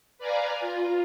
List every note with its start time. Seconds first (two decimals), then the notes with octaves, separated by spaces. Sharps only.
0.18 B4 D5 F5 G#5 A#5
0.60 F4